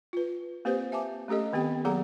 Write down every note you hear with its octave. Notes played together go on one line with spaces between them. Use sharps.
F4 B4
A#3 C4 G4 B4 C5
E5 G#5 A5 D6
A3 C#4 G4 A4 D#5
D#3 B3 C4 G4 G5
F#3 A#3 G#4 A4 F#5 A#5